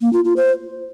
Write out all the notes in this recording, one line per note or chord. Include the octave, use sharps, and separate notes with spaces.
A#3
F4
F4
C5